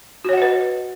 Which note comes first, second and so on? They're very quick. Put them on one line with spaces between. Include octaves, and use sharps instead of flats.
F#4 C#5 F#5 D#5 B4